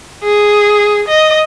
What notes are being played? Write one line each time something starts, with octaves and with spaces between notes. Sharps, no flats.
G#4
D#5